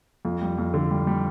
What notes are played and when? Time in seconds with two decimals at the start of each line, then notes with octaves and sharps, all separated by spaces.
0.25 F2
0.41 G3
0.58 F2
0.74 D3
0.91 G3
1.07 G3